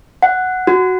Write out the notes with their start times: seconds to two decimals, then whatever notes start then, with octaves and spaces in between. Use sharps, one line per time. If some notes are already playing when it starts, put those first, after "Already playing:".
0.22 F#5
0.67 F#4